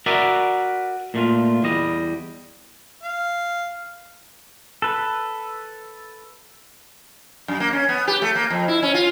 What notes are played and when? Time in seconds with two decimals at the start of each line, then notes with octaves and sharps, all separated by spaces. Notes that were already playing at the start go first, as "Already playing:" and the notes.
0.06 F#4 A#4 B4 D5 E5
1.14 A#2 A3 F4
1.63 E2 G3 D#5
3.03 F5
4.82 A4 B4
7.48 F#2
7.60 A#3
7.73 C#4
7.89 B3
8.07 G4
8.22 A3
8.35 A#3
8.50 F2
8.68 E4
8.83 C#4
8.94 F4